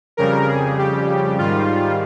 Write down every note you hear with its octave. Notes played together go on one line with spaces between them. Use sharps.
F2 C#3 G3 A#4
G#4
G4
G#2 D#3 G3 F4